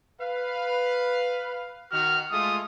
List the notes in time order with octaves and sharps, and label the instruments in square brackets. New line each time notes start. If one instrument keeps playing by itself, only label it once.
[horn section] B4 F5
[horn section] D#3 F#4 [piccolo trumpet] F6
[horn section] G#3 A3 F4 [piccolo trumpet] D#6